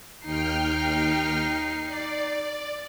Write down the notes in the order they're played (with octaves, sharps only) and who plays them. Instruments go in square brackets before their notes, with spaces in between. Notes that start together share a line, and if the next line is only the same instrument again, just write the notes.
[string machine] D#2 G5 F6 [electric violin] D#4 C7
[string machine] D5